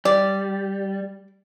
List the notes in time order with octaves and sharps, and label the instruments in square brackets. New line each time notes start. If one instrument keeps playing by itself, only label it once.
[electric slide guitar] G3 [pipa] D5